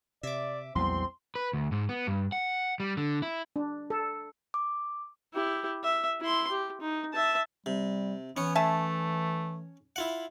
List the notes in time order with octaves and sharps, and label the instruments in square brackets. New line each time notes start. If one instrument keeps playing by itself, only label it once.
[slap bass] C3 [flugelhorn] D5 [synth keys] E5 D6
[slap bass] A#1 F#3 G3 [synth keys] E2 [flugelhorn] C4 [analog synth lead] C6
[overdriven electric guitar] B4
D2
G#2
B3
G2
F#5
G3
D3
E4
[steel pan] D4
A4
[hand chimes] D6
[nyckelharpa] E4 G4
E5
E4 C6
G4
D#4
E5 A5
[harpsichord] C3 [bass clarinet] G3
[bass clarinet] E3 [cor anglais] B3 [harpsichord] C#4 C#5
[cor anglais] A3 [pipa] E5 G#5 A5
[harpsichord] E4 F4 F#5